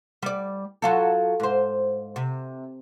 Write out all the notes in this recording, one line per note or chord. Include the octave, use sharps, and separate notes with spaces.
G3 D5
F#3 F4 A4
G#2 C5
C3